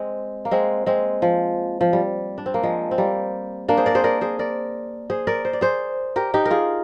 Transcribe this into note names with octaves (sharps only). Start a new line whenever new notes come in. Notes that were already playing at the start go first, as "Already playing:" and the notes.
Already playing: G#3 C4
A#3
G#3 C4
G#3 C4
F3
F3
G3
D4
C4
A#3
F3 G#3
C4
G3 A#3
A#3 D4
G#4 C5
A#4 D5
G#4 C5
A#4 D5
G#4 C5
A#4 D5
G#4 C5
A#4 D5
C5
D5
G#4 C5
G4 A#4
D#4 G4
A#4
F4 G#4